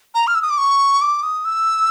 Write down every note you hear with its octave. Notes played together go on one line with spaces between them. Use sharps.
A#5
F6
E6
D#6
D6
C#6
D6
D#6
E6